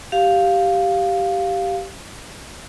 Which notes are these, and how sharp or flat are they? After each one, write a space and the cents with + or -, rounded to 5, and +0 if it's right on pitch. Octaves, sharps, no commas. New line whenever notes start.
G4 -10 F5 +0